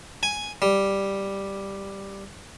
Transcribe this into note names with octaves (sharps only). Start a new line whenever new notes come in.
G#5
G3